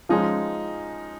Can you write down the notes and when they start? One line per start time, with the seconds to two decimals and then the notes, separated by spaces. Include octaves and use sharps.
0.09 F3 G#3 C#4 D#4